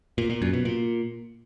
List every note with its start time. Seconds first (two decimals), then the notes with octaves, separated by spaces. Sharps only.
0.18 A#2
0.30 A#2
0.42 F#2
0.53 B2
0.65 A#2